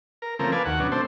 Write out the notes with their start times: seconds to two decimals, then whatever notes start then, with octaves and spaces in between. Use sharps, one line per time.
0.22 A#4
0.39 C#3 F3 A3 A#3 C4 A#4
0.52 B4 D5 F5 G#5 A5
0.66 D#2 F#4 F#5
0.79 B2 F#3 C#4 D4
0.92 A3 C4 D4 C5